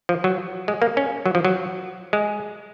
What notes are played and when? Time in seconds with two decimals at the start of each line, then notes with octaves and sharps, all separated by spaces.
0.09 F3
0.24 F#3
0.68 G#3
0.82 A#3
0.97 C#4
1.26 F#3
1.35 F3
1.45 F#3
2.13 G#3